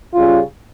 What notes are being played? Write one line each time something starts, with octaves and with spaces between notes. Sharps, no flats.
C#3 G3 C#4 F4